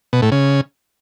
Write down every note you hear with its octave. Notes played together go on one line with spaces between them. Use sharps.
B2
A2
C#3